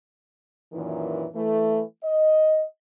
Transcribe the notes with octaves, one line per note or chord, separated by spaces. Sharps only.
F#2 A#2 D#3 E3
E3 A3
D#5